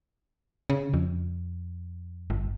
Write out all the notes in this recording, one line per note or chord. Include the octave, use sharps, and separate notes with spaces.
C#3
F2
G1